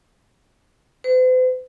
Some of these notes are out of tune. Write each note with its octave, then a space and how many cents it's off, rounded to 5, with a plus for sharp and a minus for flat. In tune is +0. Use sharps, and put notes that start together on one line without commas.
C5 -45